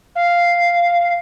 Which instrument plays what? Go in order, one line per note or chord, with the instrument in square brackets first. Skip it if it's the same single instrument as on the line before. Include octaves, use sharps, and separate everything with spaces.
[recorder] F5